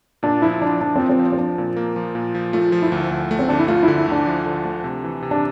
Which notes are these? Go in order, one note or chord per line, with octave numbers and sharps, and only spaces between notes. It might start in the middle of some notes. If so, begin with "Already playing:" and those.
A#2 D4
F3 E4
F3 D4
F3 D4
F3 C4
C4
F3
C4
F3 D4
A#2
A#3
F3
A#2
F3
A3 F4
F3
E4
D2
D2
A3
C4
D2 D4
E4
A3 F4
D3 E4
E4
D2 D4
F3
D3
A3
C3
E3
C3
D4